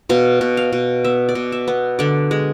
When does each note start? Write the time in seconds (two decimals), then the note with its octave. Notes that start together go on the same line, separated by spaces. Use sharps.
0.09 B2 F5
0.41 B2
0.57 F5
0.72 B2
1.04 B3 E5
1.29 D5
1.35 B2
1.52 E5
1.68 B3
1.99 D3 D5
2.31 G#3